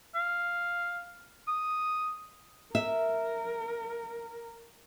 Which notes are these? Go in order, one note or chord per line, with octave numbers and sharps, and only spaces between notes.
F5
D#6
A#4 E5